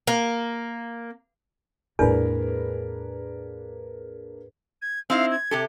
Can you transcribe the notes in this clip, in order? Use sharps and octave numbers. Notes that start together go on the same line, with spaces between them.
A#3
E2 A2 G#3 A#3 D4 G#4 A#4 B4
G#6
C4 D#4 E4 F5
G#6
C3 G4 A4